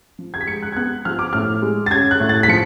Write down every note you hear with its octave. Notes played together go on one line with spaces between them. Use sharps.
F3
G#6
B6
G#3 C#7
F#6
G#6
B3 F#6
F3 F6
D6
A2 F6
G#3
A6
C#4 G#6
F#6
A2
A6
B6
F3 C#7